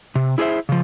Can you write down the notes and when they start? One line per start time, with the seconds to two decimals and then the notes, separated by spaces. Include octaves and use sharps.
0.15 C3
0.38 E4 G#4 A#4 C5 E5
0.69 C#3 F3